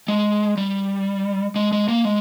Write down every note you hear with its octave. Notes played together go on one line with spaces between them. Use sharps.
G#3
G3
G#3
G#3
A#3
G#3